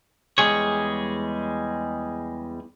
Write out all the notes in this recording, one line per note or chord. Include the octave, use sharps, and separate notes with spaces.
E2 G#2 G3 G#3 G#4 C#5